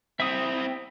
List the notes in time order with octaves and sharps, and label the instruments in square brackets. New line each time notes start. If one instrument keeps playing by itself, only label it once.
[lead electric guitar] C4 E4 [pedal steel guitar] E5 D#6